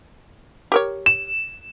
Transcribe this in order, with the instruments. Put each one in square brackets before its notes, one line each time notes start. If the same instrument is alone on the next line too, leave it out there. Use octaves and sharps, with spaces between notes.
[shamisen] G4 A#4 C#5
[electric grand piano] E7